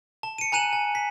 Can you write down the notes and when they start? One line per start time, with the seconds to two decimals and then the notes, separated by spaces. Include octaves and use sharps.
0.23 A5
0.38 C#7 D#7
0.52 G#5 A#5 F#6 D#7 E7 F#7
0.73 G#5
0.95 B6